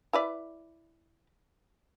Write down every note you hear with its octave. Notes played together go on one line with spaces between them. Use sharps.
E4 B4 D5